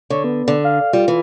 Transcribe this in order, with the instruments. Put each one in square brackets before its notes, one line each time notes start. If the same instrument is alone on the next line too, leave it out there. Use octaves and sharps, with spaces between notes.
[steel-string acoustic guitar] D3 [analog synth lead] C#5
[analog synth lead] B3
[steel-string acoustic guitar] D3
[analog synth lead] F5
[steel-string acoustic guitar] G3 [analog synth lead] F4
[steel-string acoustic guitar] E3